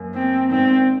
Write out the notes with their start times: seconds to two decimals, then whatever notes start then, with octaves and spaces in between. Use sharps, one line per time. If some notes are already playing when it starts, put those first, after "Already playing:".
Already playing: F#2 A#3
0.14 C4
0.50 G#1 G#2 D#3 C4